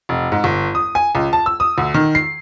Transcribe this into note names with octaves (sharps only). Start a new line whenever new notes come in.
F1
G#2
G1
D#6
G#5
C#2
A5
E6
D#6
D2
D#3
C7